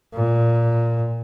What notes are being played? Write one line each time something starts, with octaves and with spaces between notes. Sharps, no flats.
A#2